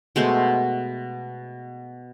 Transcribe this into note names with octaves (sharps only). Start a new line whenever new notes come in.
B2 G#3 A3 C5